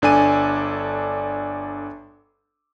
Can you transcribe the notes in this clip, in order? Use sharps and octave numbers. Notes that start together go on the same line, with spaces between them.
G1 D4 A4 G#5 D#7